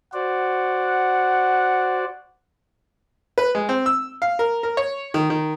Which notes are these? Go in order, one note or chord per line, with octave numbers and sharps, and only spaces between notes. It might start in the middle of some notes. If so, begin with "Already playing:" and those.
F#4 C5 D5 F#5
B4
G#3
C4
E6
F5
A#4
A#4
C#5
D#3
D#3